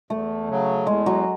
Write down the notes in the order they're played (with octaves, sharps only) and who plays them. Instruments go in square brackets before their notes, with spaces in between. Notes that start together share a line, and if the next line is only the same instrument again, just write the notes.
[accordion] E2 [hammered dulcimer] A3
[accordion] C#3 F#3
[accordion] E2 [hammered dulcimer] G#3
[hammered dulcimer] F#3